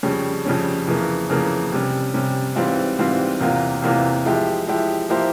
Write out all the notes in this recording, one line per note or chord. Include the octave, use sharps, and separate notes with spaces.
F2 C#3 G3 C#4
F2 C#3 G3 C#4
F2 C#3 E3 A#3
F2 C#3 E3 A#3
C3 G3 C#4
C3 G3 C#4
G#2 E3 G3 C4 F4
G#2 E3 G3 C4 F4
E2 C3 E3 A#3 F4
E2 C3 E3 A#3 F4
F3 G#3 E4 G4
F3 G#3 E4 G4
F3 A#3 E4 G4 C5